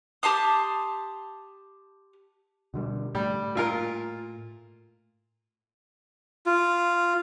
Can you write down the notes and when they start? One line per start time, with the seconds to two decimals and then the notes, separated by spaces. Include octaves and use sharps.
0.23 G4 A5 C6 D#6
2.74 B2 D3 G3
3.15 A2 G3
3.55 A#2 F4 A#4
6.46 F4